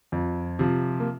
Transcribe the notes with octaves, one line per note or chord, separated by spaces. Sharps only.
F2
C3 F3
A#3